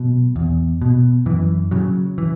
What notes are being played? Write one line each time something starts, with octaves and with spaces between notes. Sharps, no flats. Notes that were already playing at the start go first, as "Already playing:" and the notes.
Already playing: B2 F#3
E2
B2
F#2 E3
C#3 F#3
E3